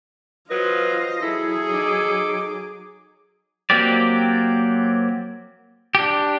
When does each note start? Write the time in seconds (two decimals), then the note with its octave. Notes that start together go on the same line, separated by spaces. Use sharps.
0.51 F#3 F4 B4 C5 D#5
1.22 F#3 E4 G#4 A4
1.73 D#4 D6
3.70 F#3 A#3 C4 G4 D5
5.95 D4 G4